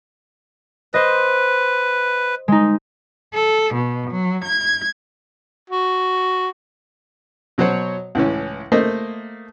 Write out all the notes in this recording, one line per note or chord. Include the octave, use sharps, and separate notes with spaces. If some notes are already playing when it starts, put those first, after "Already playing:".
B4 C5 D#5
G#3 D#4
A4
B2
F#3
G#6
F#4
B2 F#3 F#4 C5 C#5
C#2 A2 E3 C#4
A3 A#3 C5 D#5